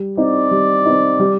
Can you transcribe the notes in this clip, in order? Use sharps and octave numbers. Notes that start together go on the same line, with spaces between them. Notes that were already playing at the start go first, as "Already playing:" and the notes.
Already playing: G3
C4 D#4 D5
G3
C4 D#4
G3